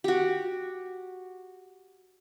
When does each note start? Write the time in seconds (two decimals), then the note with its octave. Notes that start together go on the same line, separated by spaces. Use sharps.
0.04 F#4 G4